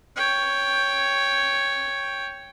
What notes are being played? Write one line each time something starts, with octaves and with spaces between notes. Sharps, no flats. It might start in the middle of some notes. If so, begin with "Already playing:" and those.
C#5 G5